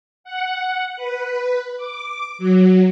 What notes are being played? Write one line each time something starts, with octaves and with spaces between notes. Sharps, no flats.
F#5
B4
D6
F#3